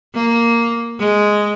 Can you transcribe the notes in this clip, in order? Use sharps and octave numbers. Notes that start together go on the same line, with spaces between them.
A#3
G#3